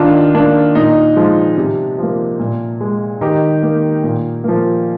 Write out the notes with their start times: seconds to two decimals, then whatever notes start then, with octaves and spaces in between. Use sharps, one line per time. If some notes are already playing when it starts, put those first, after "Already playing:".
Already playing: D#3 D4 F4
0.34 A#3 D4
0.75 A#2 D#4
1.16 F3 G#3
1.57 C3
1.98 F3 A#3
2.40 A#2
2.81 G#3
3.21 D#3 D#4 G4
3.62 A#3
4.03 A#2
4.44 F3 A#3